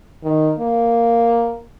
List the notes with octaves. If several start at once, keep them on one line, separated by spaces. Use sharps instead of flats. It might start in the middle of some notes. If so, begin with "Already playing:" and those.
D#3
A#3